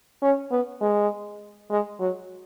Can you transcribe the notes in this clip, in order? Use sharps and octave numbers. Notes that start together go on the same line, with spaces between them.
C#4
B3
G#3
G#3
F#3